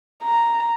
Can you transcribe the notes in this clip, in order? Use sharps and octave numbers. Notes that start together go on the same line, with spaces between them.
A#5